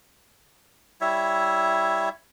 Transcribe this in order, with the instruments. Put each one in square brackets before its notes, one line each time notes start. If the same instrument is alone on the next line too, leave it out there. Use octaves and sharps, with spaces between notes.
[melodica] G3 E4 C#5 E5